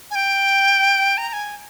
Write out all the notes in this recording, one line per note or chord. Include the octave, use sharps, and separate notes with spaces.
G#5
G5
A#5
A#5
G#5